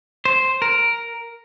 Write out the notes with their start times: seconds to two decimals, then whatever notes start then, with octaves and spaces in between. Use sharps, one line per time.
0.25 C5
0.62 A#4